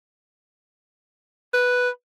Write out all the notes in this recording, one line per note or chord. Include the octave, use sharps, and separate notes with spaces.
B4